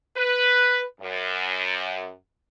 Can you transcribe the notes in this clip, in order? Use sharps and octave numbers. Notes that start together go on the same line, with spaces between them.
B4
F#2